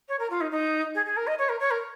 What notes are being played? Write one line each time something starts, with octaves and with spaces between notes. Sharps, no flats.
C#5
A#4
F4
D#4
D#4
G#4
G#4
A#4
D#5
C#5
A#4
C#5
A#4